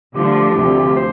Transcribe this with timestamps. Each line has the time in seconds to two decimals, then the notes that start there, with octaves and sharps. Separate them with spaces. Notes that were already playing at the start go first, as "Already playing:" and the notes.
0.15 D3 F3 A3 D4 G4
0.56 D2 C3 F3
0.96 C5